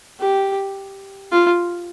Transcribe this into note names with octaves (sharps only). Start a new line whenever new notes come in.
G4
F4